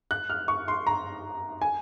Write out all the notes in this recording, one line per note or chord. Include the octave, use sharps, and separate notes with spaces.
F#6
F6
C#6
C6
A#5
G#5